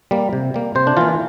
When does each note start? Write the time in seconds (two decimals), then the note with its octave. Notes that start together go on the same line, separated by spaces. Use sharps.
0.11 G3 A#3
0.33 C3
0.54 G3 A#3
0.75 C3 C5
0.87 D4
0.97 E3 A#3 F4